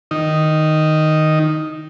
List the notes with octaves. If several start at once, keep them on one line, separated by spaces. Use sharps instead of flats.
D#3 D#4